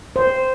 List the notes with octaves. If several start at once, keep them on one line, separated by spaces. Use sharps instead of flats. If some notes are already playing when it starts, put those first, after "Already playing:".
C5